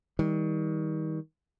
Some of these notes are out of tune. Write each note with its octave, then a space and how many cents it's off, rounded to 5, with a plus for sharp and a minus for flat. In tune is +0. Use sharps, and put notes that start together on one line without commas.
D#3 +35 G3 +20